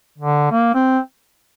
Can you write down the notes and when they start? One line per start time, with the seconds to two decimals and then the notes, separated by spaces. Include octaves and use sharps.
0.18 D3
0.52 A#3
0.75 C4